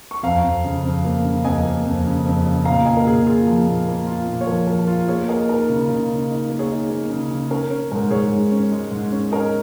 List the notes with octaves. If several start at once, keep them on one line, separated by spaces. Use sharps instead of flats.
C#6
F2 F5 A#5
F2
C#3
F2
A#3
C#3
F2 D#5 G#5
A#3
F2
C#3
F2
C#3
A#2 F5 A#5
A#2 D#5 G#5
A#4
A#2 G#4
F4 G#4
F3
A#2
A#3
F4
A#2
C#5
F3 A#4
F3 A#4
F4
A#3 G#4 C#5
A#3 A#4 D#5
D#4 A#4
C#3
C#3
C#3
D#4
A#3
G#4 C#5
D#4
A#3
C#3
C#3
C#4 A#4
C#4
G#2 A#4
G#2 G#4 C#5
G#2
C#4
G#3
G#2
C#4
C#4 A#4 D#5